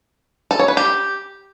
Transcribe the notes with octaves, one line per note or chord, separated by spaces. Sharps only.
A4
C#5
B4
G4